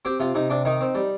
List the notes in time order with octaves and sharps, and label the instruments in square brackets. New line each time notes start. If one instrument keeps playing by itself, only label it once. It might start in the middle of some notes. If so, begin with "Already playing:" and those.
[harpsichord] C4 G4
C3 F4
C3 D#4
C3 D4
D#3 D#4
C4
G3